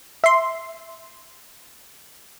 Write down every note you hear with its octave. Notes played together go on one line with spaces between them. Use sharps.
E5 C6